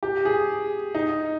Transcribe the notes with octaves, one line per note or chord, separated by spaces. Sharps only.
G4
G#4
D#4